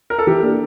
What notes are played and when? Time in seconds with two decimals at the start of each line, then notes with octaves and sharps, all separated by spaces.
0.10 A#4
0.18 A4
0.27 E3 G4
0.42 A#3 D4 A4